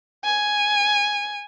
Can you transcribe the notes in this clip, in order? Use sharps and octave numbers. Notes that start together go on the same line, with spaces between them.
G#5